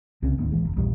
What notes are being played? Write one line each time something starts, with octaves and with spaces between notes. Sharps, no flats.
C2 C#3 C4
D1 D#2 G#2 B3
A1 E3 G#3
F1
A#1 E2 G2 G3